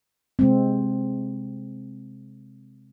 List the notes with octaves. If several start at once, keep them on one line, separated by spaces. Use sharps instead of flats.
C3 G#3 C4